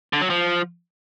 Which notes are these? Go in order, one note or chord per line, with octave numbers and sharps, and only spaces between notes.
D3
F#3
F3